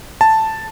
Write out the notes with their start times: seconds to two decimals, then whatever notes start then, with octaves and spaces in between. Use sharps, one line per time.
0.21 A5